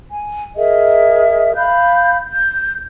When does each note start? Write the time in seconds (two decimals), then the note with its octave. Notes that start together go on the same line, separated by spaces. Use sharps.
0.12 G#5
0.57 G#4 A#4 D#5 E5
1.56 F5 B5 F#6 G6
2.32 G6